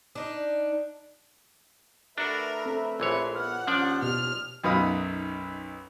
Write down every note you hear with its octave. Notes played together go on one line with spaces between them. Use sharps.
D4 D#4
A3 D4 F#4 A#4 B4 E5
C4 A4
A#1 E3 C#5 C6
B3 F#5 F6
D#2 F3 C#4 D4 D5
B2 G4 F6
B1 F#2 D#4 B4 F5 D#6